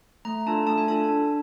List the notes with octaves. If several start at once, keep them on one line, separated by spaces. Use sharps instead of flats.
A3 A#5
D4 F4 A4 A5
A3 A5
G#5
D4 F4 A4 A5
D4